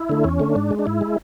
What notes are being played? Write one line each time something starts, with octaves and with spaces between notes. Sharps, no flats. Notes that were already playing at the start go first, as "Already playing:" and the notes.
Already playing: E4
D3 A3
E2 C#4
D3 A3
G#2 D4
G#3
D4
G#2 E4
G#3